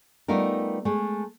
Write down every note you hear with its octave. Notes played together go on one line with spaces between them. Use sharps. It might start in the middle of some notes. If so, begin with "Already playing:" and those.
G3 A3 B3 D#4 F4 A#4
G#3 A3